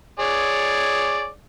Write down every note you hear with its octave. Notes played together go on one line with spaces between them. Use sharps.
G#4 C#5 D5